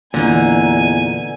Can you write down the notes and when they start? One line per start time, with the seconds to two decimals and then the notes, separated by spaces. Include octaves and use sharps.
0.14 E2 A#2 D3 E3 D#4 G#5